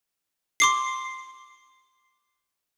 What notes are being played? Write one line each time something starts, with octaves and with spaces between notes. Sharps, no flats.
C6 D6 C7